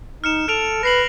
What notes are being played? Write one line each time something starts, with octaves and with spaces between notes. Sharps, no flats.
D#4 F6 C#7 E7
A4 F6 D7 F7
B4 A#6 C7 F#7